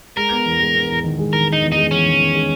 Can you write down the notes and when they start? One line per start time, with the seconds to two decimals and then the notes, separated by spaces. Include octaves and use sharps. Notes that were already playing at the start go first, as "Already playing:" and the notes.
0.17 G#3 A#4
0.31 B3
0.45 E2
0.60 G#3
0.75 B3
0.89 E2
1.04 D#3
1.19 G#3
1.33 D#3 A#4
1.48 G#3
1.53 D#4
1.63 E2
1.72 D#4
1.77 G#3
1.91 E2 C#4
2.06 D#3
2.21 D#3
2.35 G#3